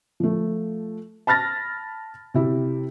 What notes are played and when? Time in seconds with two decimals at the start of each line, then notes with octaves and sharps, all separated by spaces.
0.20 F3 A3
1.27 A5 B5 F6 A6 A#6
2.34 C3 E4 G4